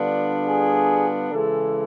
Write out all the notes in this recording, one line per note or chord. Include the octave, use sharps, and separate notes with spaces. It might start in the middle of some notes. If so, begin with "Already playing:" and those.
Already playing: D3 G3 B3 D4 F4
G#4
C#3 E3 G#3 A4